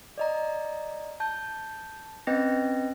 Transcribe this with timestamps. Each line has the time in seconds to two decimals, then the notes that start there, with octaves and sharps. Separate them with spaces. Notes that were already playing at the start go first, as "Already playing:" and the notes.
0.18 D5 D#5 A#5
1.20 A5 G6
2.27 C4 C#4 B4 D#5 G5 A#6